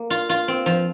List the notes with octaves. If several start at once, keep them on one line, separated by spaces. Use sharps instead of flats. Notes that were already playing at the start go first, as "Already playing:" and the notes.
Already playing: A#3
F4
F4
C4
F3